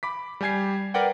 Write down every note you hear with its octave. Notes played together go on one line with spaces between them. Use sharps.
B5 D6 B6
G3 G4 G#5 G#6 C7
A#4 B4 D5 F#5 G5